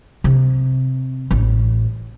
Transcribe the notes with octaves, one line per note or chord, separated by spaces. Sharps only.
C3
A1